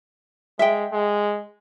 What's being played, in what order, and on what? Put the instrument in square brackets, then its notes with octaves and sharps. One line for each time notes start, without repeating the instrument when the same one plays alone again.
[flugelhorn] G#3 [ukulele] E5 G5
[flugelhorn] G#3